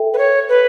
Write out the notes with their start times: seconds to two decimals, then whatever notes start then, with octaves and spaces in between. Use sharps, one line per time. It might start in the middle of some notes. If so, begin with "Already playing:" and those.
Already playing: A4 E5 G5
0.14 B4
0.18 C#5
0.49 B4